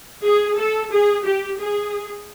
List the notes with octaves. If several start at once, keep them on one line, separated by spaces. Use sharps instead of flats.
G#4
A4
G#4
G4
G#4